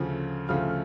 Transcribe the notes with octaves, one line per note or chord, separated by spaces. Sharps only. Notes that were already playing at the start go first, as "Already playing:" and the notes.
Already playing: D2 C#3 F3 A3
D2 C#3 F3 A3 F5 F6